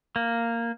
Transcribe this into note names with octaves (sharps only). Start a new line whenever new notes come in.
A#3